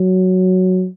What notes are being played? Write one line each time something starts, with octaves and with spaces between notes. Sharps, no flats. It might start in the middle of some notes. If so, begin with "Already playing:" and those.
Already playing: F#3